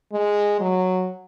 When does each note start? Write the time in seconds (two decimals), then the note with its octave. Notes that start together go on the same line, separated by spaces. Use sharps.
0.13 G#3
0.60 F#3